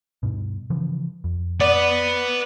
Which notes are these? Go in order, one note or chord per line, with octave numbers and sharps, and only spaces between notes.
G2 B2
C#3 E3 F3
F2
B4 D5 F#5